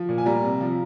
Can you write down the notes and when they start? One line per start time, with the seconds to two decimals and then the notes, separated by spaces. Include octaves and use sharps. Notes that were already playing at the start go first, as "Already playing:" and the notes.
Already playing: F3
0.09 A#2
0.18 G#5
0.26 G3 A#5
0.44 C3
0.61 F3